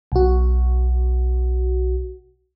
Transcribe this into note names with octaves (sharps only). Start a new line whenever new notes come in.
B1 F#4